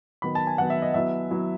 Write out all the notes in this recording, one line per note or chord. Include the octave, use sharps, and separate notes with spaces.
D#3 F#3 B3 B5
A5
G#5
D#3 F#3 B3 F#5
E5
D#5
F#3 B3 E4 E5
F#3 B3 E4